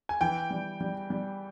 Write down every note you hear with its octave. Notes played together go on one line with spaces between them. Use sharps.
G#5
E3 G5
G3
G3
G3